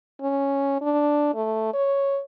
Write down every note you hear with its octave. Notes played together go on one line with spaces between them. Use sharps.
C#4
D4
A3
C#5